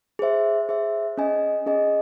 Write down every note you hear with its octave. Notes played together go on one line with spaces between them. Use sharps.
G#4 C5 E5
G#4 C5 E5
C#4 G#4 D#5 G#5
C#4 G#4 D#5 G#5